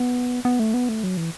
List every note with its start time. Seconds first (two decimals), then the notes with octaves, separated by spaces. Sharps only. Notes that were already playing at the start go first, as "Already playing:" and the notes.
Already playing: B3
0.45 B3
0.59 A3
0.74 B3
0.89 A3
1.04 F#3
1.17 E3